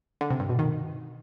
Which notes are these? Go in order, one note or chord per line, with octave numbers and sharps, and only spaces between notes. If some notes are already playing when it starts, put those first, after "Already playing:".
D3
C3
G2
B2
D#3